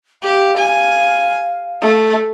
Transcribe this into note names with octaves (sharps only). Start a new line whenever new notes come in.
G4 F5
G#5
A3